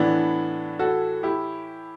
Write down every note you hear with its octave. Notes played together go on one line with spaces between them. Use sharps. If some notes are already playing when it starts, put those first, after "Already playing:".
Already playing: A2 E3 B3 D4
F#4 A4
E4 G4